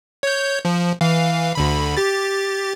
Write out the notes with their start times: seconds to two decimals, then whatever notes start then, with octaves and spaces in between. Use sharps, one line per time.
0.23 C#5 G6
0.65 F3
1.01 E3 F5
1.55 D2 D3 B5
1.97 G4 A6